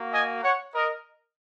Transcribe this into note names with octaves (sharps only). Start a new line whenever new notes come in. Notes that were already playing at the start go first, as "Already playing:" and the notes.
Already playing: A#3 F#4
D#5 G#5
C#5 F#5
A#4 D#5